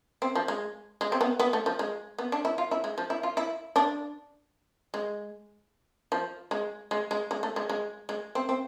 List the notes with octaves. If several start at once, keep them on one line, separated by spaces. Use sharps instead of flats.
C4
F3
G#3
G#3
C4
B3
B3
A3
F3
G#3
B3
D4
E4
F4
E4
G#3
F3
E4
F4
E4
D4
G#3
F3
G#3
G#3
G#3
G#3
A3
G#3
G#3
G#3
C4
C4